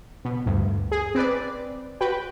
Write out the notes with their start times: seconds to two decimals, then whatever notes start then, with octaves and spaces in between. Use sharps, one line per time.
0.25 B2
0.46 D2 G2
0.92 G#4
1.15 C4 B4 D5
2.01 F#4 B4 G5